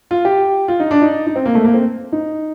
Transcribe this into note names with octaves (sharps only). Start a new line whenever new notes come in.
F4
G4
F4
D#4
D4
D#4
D#4
C4
A#3
A3
A#3
C4
D#4